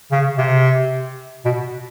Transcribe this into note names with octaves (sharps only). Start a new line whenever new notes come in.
C#3
C3
B2